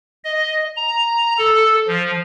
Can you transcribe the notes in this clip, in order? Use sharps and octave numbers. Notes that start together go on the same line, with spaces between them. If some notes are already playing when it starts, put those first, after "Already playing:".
D#5
A#5
A4
F3